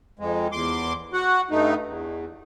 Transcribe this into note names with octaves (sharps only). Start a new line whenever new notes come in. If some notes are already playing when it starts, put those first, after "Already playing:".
F2 G#3
E2 C6 D6
F#4 F#5
G2 A3 D#4
E2